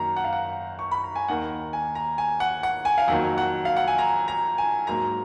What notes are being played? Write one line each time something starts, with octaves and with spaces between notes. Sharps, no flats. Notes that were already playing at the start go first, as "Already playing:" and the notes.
Already playing: F#2 D#3 A#3 A#5
F#5
F5
F#5
C#6
B5
A#5
G#5
D#2 D#3 A#3 F#5
G#5
A#5
G#5
F#5
F#5
G#5
F5
F2 D#3 F#3 A#3 F#5
F#5
F5
F#5
G#5
A#5
A#5
G#5
G#2 F#3 A#3 A#5